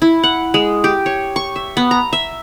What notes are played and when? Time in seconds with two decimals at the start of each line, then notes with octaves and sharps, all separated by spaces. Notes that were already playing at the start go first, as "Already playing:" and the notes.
0.02 E4
0.24 F#5
0.54 G#3
0.84 G4
1.06 C#5
1.36 C#6
1.56 E5
1.77 B3
1.91 A#5
2.13 E5